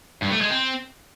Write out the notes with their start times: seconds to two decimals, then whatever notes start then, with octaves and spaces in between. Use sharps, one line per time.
0.22 G2
0.32 A3
0.41 G#3
0.51 C4